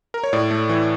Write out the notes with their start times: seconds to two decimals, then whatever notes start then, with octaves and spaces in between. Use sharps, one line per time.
0.14 A#4
0.24 C#5
0.33 A2 D5
0.51 A3
0.69 E3